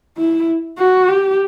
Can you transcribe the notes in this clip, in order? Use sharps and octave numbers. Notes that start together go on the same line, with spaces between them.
E4
F#4
G4